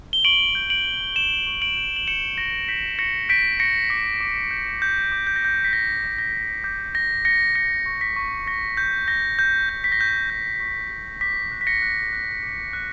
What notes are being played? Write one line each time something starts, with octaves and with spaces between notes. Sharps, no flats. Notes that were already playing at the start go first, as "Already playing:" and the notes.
G7
C#6 D7 F#7
G6
D7 F#7
G6
C#6 E7 G7
C#6
D7 F#7
G6
F#7
G6 C#7 E7
C#6 A#6
G6 B6
C#6 A#6 C#7
G6 B6 D7
C#6 A#6 C#7
D6 B6
D6
G6
D6 G6
D6
G6
A#6
D6 G6
B6
G6 A#6
D6
A#6
G6
D6 G6
G6 A#6
G6 A#6 C#7
G6 A#6 C#7
C#6
B6
C#6
C#6 A#6
G6
C#6 A#6
G6
G6
B6
A#6
C#6 G6
A#6
G6
C#6
G6
D6 B6
F#6
B6
A#6 C#7
F#6
F#6
D6
F#6